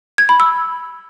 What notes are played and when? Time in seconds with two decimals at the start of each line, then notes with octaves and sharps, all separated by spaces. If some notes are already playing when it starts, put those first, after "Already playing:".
0.18 G#6
0.29 B5
0.40 E6